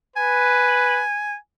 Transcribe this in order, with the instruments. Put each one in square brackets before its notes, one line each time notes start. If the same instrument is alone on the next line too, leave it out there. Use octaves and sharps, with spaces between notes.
[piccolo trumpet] B4 [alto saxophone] G#5